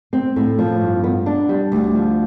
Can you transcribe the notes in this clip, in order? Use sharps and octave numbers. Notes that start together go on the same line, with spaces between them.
C4
A2
F3
G2
B3
D4
G3
D2
F3